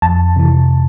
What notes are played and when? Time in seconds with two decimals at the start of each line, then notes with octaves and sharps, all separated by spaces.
0.02 F2 A5
0.36 C3 E3